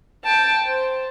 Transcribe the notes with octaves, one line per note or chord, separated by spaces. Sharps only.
G5 A5
C5